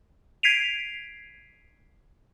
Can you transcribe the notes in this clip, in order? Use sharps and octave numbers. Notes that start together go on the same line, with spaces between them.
G#6 B6 C7 D7 D#7 F7